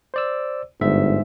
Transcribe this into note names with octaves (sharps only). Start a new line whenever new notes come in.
C5 D5 E6
G1 G#2 E5